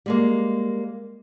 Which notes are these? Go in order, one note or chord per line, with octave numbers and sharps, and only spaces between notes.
G3 G#3 A#3